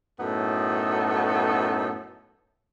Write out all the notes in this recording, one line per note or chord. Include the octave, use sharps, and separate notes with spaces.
F#2 A2 B3 D#4 A4